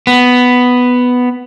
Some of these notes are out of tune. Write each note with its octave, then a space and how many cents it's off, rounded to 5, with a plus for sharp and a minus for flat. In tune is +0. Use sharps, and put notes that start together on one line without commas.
B3 +5